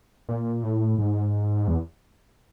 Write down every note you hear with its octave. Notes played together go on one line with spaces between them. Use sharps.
A#2
A2
G#2
E2